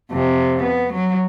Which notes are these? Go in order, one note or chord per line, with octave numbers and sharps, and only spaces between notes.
F2 C3
B3
F#3